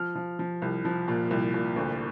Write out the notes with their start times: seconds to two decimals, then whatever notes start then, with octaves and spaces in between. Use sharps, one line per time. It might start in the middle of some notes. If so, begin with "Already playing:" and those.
Already playing: F3 F6
0.15 F3
0.39 F3
0.62 C2
0.85 F3
1.08 A#2
1.31 C2
1.54 A#2
1.76 D2